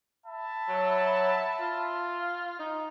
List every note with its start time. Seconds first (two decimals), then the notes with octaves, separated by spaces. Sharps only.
0.26 E5 A5 B5
0.68 F#3
1.59 F4
2.59 D#4